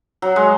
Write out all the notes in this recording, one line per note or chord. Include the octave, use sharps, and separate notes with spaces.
F#3
G#3